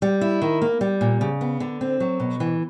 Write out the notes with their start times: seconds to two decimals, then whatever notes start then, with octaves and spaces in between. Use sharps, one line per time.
0.02 G3
0.21 E4
0.42 D#3
0.62 A#3
0.81 G3
1.01 A#2
1.21 C#3
1.41 B3
1.60 D3
1.81 C4
2.00 F#3
2.20 B2
2.40 E3